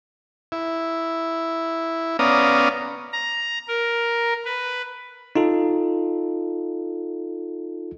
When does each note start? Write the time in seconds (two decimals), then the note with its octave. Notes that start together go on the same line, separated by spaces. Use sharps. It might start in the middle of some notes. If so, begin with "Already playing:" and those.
0.52 E4
2.19 B3 C#4 D5 F5 A#5 D#6
3.13 A#5
3.68 A#4
4.45 B4
5.36 D#4 F4 A4